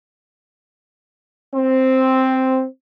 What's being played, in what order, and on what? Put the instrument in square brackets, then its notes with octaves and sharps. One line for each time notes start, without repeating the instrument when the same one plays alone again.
[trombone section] C4